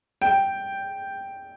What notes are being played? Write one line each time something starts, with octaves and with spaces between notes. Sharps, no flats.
G5